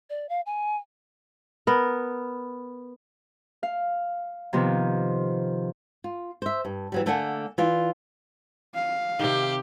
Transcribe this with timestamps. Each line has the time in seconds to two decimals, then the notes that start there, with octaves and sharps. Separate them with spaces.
0.10 D5
0.29 F5
0.46 G#5
1.67 B3 A#4
3.63 F5
4.53 C3 D#3 F3 B3
6.04 F4
6.42 C5 E5
6.65 G2
6.92 E3 F#3 G3
7.06 D3 A3 A#3 D5 F#5 G#5
7.58 E3 F4 D5
8.75 F5
9.19 C3 D#3 G4